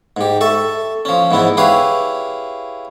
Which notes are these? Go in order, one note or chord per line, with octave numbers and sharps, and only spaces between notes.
G#2 G4
A4 E5 C#6
F3 C#4
G#2 E3 B3 E4
E4 G4 G#4 B4 C#5 F5